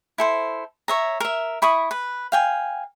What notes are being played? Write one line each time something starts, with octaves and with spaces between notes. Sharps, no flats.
E4 A4 C5
C#5 E5 A#5
A#4 E5
E4 B5 C#6 D#6
B4
F5 G5 G#5